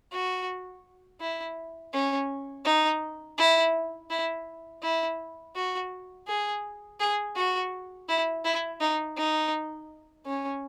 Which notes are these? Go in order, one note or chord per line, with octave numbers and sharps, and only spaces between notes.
F#4
E4
C#4
D#4
E4
E4
E4
F#4
G#4
G#4
F#4
E4
E4
D#4
D#4
C#4